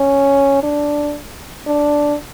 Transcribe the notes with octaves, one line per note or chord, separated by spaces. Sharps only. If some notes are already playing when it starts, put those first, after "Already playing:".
Already playing: C#4
D4
D4